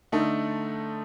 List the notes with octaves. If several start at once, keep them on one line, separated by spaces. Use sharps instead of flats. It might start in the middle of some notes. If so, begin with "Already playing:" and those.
D3 A3 D#4 A4